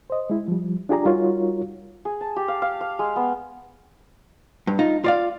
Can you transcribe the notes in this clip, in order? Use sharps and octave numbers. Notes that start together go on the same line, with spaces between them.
C5 D#5
G#3 E4
F3 G3
D4 F4 G4 G#4 D5 A#5
G3 D#4 F4 F#4 A#4 C#5
G#4
A5
G4
F5
F5
F5
G#3
B3
G2
D#4 F4
F4 D5 F5